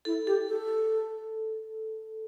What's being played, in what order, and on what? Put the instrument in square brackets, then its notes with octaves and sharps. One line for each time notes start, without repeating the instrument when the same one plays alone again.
[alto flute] E4 [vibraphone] A4
[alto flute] G4 [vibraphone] A4
[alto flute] A4